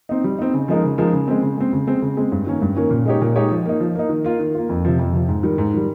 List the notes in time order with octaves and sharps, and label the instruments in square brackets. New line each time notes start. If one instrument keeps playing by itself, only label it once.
[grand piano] C4 D#4
G3
C4 D#4
C#3
F3 G#3 D#4 A#4
C#3
F3 G#3 D#4 A#4
C#3
G#3 C4
C#3
G#3 C4
C#3
G#3 C4
C#3
G#3 C4
G2
D#3 A#3 C#4
G2
D#3 A#3 C#4
A#2
G#3 D#4 G4 C#5
A#2
G#3 D#4 G4 C#5
F3
A#3 D#4
F3
A#3 D#4
D#3
A#3 F4
D#3
A#3 F4
F2
C3 F3
F2
C3 F3
G#2
D#3 G3
G#2
D#3 G3